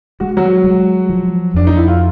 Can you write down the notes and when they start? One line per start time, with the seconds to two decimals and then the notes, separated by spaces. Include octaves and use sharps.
0.20 G#3 F#4
0.37 F#3 F#4
0.64 G#3
1.10 F3
1.54 F2 D4
1.67 D#4
1.76 E4
1.88 F4